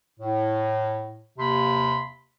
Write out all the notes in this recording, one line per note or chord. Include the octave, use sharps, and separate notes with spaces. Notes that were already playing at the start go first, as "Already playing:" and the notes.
A2
D#2 C3 A#3 B5 C6